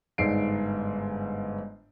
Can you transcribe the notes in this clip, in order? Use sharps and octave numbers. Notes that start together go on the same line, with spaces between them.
G1 G#2 D5 C7 D7